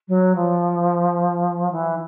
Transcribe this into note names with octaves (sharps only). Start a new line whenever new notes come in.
F#3
F3
E3